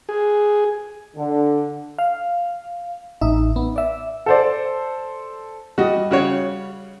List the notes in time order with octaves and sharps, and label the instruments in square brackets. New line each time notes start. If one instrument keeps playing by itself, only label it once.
[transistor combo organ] G#4
[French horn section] D3
[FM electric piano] F5
A1 D#4 E5
B3
D5 E5
[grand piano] A4 C5 D5
[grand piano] G3 [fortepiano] F#4 D#5
[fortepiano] C#3 F#4 C#5